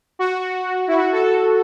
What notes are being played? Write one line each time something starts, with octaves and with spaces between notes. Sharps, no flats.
F#4
E4
F#4
A4
A4